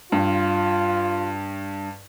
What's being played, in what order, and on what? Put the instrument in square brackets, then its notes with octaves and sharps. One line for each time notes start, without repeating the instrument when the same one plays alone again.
[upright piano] G2 [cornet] F4